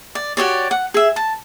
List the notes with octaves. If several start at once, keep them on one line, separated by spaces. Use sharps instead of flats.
D5
F#4 G4 C#5 D5
F#5
G#4 E5
A5